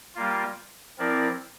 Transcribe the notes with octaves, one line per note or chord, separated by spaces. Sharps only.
G3 A#3 F4
F3 C4 E4 A#4 D5